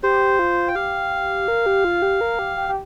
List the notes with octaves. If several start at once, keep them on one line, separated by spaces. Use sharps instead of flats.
G4 C5
F4
G5
G4 F5
A#4
G4
F4
G4
A#4
G4
G4
G4